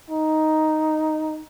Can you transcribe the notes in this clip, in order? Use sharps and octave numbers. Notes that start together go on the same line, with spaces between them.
D#4